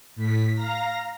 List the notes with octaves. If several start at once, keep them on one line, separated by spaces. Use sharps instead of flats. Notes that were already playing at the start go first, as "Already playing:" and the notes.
A2 B6
F5 A#5 A#6